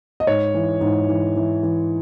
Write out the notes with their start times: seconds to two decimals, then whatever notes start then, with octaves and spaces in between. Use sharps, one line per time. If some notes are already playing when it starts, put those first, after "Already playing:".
0.20 D#5
0.27 G#2 C#5
0.54 E3
0.81 G#2
1.09 E3
1.36 E3
1.63 E3